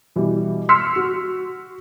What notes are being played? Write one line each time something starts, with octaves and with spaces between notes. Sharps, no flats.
B2 E3 G3
C6 E6 F6 B6 C#7
F#4